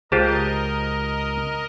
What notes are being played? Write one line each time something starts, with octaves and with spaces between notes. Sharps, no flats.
C#2 F4 G4 G#4 A#4 C5 D#5 A5